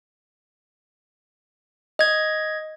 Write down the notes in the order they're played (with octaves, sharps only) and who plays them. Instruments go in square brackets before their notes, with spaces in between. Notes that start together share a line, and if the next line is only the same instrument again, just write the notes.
[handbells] D#5 G#6